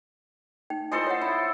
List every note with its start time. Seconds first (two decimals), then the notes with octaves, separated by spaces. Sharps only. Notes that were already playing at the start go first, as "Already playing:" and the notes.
0.70 D#4 G5
0.92 E4 F4 A4 C5 D#5 G#5
1.07 C#5 F#5
1.21 E4